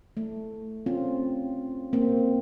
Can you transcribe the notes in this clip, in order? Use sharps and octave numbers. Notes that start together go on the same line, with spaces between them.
A3
C4 C#4 F4
A#3 C4